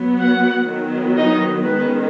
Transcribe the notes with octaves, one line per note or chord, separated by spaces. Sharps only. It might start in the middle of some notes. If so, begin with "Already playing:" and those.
Already playing: F#3 B3
F#4 F#5
D#3 F#3 B3
D#4 D#5
D#3 G#3 B3 C#4 B4